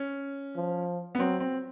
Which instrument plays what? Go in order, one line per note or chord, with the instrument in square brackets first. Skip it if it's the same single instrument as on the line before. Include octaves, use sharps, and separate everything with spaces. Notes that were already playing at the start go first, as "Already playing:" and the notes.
Already playing: [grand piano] C#4
[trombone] F3
[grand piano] B3
[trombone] F#3 [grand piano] C4
[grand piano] C4